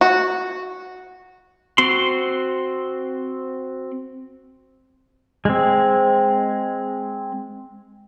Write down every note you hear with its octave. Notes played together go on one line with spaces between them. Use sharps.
F#4
C4 F#4 C6
G#3 C4